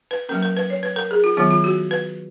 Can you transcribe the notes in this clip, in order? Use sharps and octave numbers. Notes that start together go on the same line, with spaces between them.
B4
F#3 A#3 C#4 A#4
A#4
B4
C#5
B4
A#4
G#4
F4
D#3 F#3 B3 F4
F4
F#4
B4